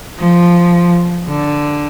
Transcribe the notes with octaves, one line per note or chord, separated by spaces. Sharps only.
F3
D3